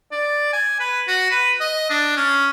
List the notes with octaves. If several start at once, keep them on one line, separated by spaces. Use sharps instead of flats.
D5
G#5
B4
F#4
B4
D#5
D4
C#4